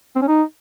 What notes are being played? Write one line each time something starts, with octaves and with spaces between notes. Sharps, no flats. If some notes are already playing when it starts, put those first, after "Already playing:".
C4
C#4
D#4